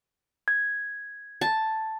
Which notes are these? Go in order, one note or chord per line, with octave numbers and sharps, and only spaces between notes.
G#6
A5